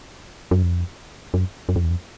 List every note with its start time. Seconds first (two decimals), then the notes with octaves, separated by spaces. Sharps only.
0.51 F#2
0.63 F2
1.34 F#2
1.69 F#2
1.76 F2
1.84 E2
1.91 F2